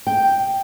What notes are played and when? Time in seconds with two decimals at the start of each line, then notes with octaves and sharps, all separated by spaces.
0.07 G5